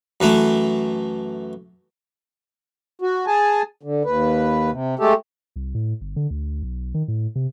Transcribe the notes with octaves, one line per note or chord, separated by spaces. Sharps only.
F#2 E3 A3
F#4
G#4 G#5 A5
D3
D#2 B4
C3
G#3 A3 G4 A4
C2
A2
G1
D3
D2
B1
D#3
A2
C3